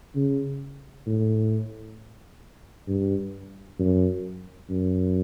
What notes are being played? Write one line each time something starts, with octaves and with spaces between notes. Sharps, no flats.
C#3
A2
G2
F#2
F#2